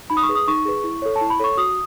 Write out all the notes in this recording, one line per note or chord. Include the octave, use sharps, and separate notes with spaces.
D#4 B5
D#6
C#6
G#4 B4
D#6
D#4 C#6
G#4 B4
E4
A4 C#5
A5
E4
B5
A4 C#5 C#6
F#4 D#6